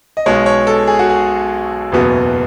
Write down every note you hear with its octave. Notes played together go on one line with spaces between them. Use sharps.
D#5
B1 B2 G#3 C#5
C#5
A4
G#4
F#4
G#4
F#1 E2 B2 F#3 B3